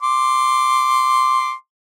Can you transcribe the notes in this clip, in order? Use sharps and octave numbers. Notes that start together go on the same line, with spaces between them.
C6 D6